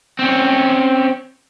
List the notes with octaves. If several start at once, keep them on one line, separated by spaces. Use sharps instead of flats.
C4 C#4